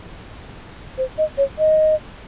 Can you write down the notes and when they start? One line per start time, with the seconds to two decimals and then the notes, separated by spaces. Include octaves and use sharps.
0.98 C5
1.18 D#5
1.38 C#5
1.59 D#5